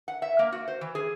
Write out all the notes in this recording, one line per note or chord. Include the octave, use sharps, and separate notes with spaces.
F#5
E5
A#3
F#4
C5
E3
G#4